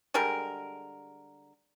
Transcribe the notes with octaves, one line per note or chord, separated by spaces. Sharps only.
D3 G3 G#3 A#4